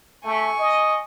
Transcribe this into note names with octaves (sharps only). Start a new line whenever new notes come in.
A3 G#5 C#6
D#5